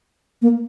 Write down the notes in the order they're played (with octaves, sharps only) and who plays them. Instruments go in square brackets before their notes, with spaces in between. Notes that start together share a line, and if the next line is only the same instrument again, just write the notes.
[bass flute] A#3